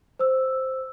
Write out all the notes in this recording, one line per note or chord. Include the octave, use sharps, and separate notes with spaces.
C5 E6